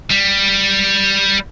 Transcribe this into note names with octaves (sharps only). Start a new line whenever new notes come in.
G3